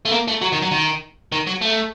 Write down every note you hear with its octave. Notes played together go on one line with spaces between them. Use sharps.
A3
A#3
A3
F#3
D#3
F#3
D#3
D#3
F#3
A3